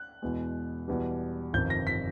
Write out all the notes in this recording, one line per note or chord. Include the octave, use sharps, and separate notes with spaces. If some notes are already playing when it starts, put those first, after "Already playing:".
Already playing: F#6
E2 B2 G#3
E2 B2 G3
G1 F2 C3 D#3 G6
A#6
B6